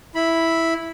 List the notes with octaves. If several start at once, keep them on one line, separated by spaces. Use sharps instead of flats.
E4 B5